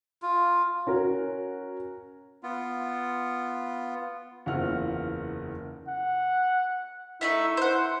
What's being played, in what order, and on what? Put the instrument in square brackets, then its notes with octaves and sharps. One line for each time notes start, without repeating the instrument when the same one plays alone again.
[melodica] F4
[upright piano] C#4 F#4 A#4
[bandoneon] B3 F4
[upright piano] F#1 E2 F4 C5 F#5 F6
[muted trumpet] F#5
[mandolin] A3 D#4 E5 [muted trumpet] E4
[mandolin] C5 F#5